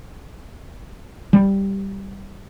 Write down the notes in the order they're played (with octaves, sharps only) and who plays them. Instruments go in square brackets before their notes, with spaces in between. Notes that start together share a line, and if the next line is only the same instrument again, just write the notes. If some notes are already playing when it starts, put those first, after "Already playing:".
[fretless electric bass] G3